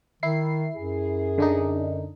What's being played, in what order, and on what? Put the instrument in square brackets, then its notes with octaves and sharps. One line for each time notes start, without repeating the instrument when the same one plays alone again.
[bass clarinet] D#3 [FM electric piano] E4 C7
[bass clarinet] F#2 [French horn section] G#4
[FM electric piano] D3 D4 D#4